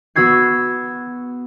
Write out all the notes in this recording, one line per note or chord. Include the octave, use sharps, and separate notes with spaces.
B3 F#4 E6 G#6 C7